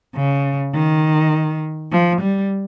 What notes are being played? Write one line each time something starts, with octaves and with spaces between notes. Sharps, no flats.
C#3
D#3
F3
G3